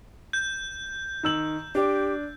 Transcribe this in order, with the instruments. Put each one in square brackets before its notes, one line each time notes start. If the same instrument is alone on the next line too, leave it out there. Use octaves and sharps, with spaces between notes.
[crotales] G6
[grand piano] D#3 E6 F#7
[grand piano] D4 [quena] G4